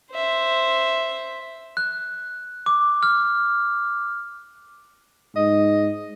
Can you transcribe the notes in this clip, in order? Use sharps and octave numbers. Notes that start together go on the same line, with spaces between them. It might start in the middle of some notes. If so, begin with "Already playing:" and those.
C5 E5
F#6
D6
F6
G#2 D#5